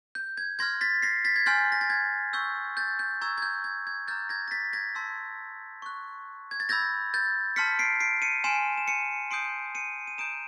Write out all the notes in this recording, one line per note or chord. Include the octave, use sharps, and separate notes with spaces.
G6
G#6
C6 F6 G#6 A#6
A6 B6
A#6 C7
A6 B6
G#6
G#5 C6 F6 G6 A6
A#6
A6
G#6
C#6 E6 G6
G6 A6
G6
A#5 C#6 E6 G6 G#6
G#6
G6
G#6
G#6
A#5 D6 F6 G6 A6
G#6 A#6
A#6
A6 B6
G#6 A#6
A5 C6 E6 G6
C#6 F#6
G#6
A6
B5 E6 G6 G#6 A#6
G6 A6
A5 C6 F6 B6 C#7
C7 D7
C7 D7
C#7 D#7
G#5 C6 F6 D7 E7
E7
C#7 D#7
C6 D#6 G6 C7 D7
C#7 D#7
D#7
A#5 D#6 G6 D7 E7